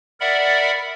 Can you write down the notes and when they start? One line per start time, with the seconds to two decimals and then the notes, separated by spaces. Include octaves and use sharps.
0.20 A#4 D5 E5 F#5 B5